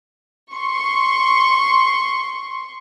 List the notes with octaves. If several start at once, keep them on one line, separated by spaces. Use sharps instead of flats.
C6 C#6